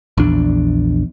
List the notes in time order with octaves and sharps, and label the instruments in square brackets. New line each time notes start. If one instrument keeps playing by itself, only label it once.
[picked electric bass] A#1 E2 D4